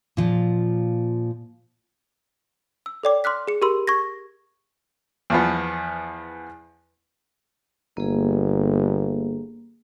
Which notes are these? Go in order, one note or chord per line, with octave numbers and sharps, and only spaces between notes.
A#2 F3
E6
A4 C#5 D5 G5 D6
C6 D6 F6 F#6 B6
G#4 C#7
G4 A#4 B5 C6 E6
C#6 G#6 A#6
E2 F3 B3
G1 A#3 G#4